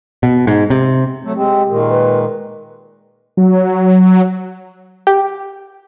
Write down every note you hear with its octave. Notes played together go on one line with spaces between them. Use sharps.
B2
G#2
C3
F#3 A3
G#3 C4 G4
A#2 D#3 G#3
B4
F#3
G4